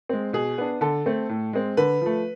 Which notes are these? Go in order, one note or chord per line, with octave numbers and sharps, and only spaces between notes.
G#3 C4
B2 G#4
B3 D4
D3 A4
A3 C4
A2
G#3 C4
D3 B4
F3 A3